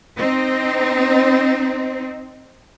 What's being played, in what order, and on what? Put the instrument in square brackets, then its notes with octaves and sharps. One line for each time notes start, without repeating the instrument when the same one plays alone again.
[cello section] C4 D#4